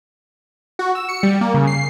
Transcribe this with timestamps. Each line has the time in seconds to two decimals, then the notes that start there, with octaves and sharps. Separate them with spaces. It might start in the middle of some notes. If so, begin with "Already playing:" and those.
0.79 F#4
0.95 E6
1.09 C#7
1.23 G3
1.41 A#3
1.54 C#3
1.67 C7